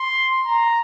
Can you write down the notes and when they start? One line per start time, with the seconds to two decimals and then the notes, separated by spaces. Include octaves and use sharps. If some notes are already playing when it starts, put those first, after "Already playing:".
Already playing: C6
0.45 A#5